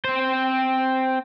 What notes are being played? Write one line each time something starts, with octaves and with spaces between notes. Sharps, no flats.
C4 C5